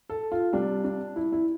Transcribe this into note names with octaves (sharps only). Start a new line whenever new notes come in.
A4
F4
C3 G3 D4
D4
E4
E4